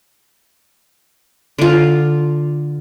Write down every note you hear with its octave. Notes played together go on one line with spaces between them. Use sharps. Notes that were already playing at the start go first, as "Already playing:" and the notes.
D3 F4